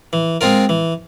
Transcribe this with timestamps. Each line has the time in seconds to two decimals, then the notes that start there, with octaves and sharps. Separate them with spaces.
0.13 E3
0.41 G#3 C4 F4 A#4
0.69 E3